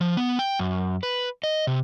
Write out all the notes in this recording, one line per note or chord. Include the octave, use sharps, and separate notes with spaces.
F3
B3
G5
F#2
B4
D#5
C3